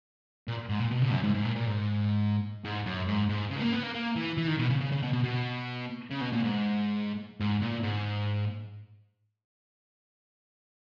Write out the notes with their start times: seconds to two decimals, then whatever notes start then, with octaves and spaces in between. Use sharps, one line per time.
0.48 A#2
0.69 G#2
0.80 A#2
0.91 B2
1.02 C#3
1.12 F#2
1.24 G#2
1.34 G#2
1.45 A#2
1.56 A#2
1.67 G#2
2.64 G#2
2.86 F#2
3.07 G#2
3.29 G#2
3.51 C#3
3.57 G#3
3.62 A#3
3.72 B3
3.83 A#3
3.94 A#3
4.16 E3
4.37 E3
4.48 D#3
4.59 B2
4.70 C#3
4.81 C#3
4.92 C#3
5.03 B2
5.13 B2
5.24 B2
6.11 C#3
6.21 B2
6.32 A#2
6.43 G#2
7.40 G#2
7.62 A#2
7.84 G#2